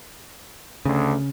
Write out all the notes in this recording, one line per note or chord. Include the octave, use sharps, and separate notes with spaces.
D2 C#3